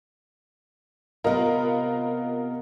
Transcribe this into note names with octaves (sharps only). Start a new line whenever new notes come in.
C3 B3 F4 A#4 D#5